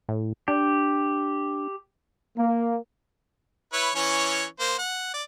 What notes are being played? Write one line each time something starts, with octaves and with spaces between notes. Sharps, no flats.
A2
D4 G4
A#3
E4 B4 C#5
E3 C#4 C#5
A#3 C5
F#5
D5